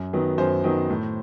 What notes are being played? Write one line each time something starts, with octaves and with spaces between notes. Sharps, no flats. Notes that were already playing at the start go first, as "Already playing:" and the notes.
Already playing: F#2
D#3 F#3 B3
F#2 C5
D#3 F#3 B3
A2